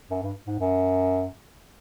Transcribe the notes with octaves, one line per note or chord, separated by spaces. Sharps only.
F#2
G2
G#2
F#2